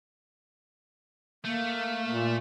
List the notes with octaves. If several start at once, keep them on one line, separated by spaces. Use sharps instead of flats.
A3 A#3
A#2